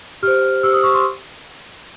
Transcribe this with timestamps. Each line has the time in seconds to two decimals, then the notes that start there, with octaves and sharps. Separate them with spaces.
0.23 G4 C5 F6
0.63 G4 C5 E6
0.73 D#6
0.83 C#6
0.94 C6